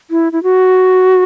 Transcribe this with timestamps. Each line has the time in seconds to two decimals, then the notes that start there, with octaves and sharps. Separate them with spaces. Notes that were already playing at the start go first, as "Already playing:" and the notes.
0.11 E4
0.32 E4
0.43 F#4